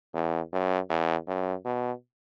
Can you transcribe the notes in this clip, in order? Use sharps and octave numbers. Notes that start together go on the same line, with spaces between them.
E2
F#2
E2
F#2
B2